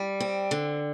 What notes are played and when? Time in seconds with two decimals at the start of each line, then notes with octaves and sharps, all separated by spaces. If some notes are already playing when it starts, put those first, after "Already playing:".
Already playing: G3
0.20 C4
0.51 D3